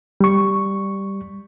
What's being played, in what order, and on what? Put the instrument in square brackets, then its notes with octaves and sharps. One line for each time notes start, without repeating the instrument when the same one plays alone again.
[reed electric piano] G3 C#6